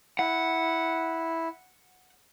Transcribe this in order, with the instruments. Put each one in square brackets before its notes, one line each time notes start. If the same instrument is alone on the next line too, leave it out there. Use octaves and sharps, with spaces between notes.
[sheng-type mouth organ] E4 [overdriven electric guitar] F#5